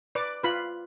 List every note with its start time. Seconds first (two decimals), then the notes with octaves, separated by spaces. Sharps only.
0.15 B4 D5 D6
0.44 F4 B4 B5